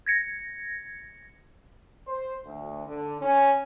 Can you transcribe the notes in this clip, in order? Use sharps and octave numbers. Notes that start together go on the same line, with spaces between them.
G#6 A#6 C#7
C5
D2
D3
C#4